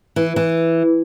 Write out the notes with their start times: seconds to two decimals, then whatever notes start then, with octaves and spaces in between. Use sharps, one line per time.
0.16 E3
0.36 E3